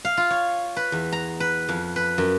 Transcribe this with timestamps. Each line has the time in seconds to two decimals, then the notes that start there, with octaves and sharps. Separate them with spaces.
0.05 F5
0.17 F4
0.30 C#5
0.76 B4
0.92 E2
1.12 A#5
1.40 B4
1.69 F2
1.96 B4
2.18 F#2